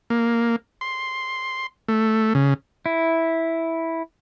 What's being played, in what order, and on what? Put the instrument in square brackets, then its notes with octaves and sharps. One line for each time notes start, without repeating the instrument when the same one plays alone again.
[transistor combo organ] A#3
C6
A3
C#3
[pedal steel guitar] E4